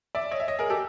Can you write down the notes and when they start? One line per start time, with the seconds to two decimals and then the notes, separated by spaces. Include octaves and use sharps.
0.15 D5 E5
0.31 C#5 D#5
0.40 E5
0.48 C#5 D#5
0.59 G#4 A#4
0.70 G4 A4